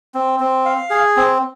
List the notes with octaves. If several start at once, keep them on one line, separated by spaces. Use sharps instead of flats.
C4
C4
F5
G#4
C4